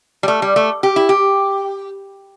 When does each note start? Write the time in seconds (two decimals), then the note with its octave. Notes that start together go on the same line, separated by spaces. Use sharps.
0.23 G3
0.28 A3
0.42 G3
0.56 A3
0.83 G4
0.96 E4
1.09 G4